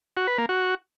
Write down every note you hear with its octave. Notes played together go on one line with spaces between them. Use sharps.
F#4
B4
A#3
F#4